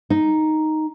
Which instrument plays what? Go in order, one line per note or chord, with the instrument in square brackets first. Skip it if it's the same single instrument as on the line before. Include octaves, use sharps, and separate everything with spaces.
[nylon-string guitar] D#4